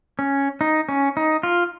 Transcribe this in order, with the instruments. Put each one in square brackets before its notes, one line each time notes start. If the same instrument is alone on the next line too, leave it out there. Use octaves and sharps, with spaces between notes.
[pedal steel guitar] C#4
D#4
C#4
D#4
F4